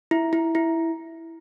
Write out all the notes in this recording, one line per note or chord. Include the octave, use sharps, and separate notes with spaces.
E4
E4
E4